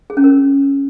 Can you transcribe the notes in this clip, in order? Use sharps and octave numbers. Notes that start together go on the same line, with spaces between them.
G#4
C#4
A#4